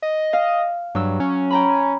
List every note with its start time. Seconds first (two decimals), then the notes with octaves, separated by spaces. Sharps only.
0.02 D#5
0.33 F5
0.95 G2 F#3 E6
1.20 C#4
1.50 G5 A#5 B5